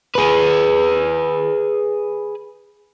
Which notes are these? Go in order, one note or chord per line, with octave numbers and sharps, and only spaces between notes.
G#4 B4